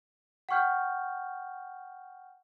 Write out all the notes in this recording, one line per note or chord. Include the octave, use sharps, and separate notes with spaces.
F#5 G5 C#6 F6 G6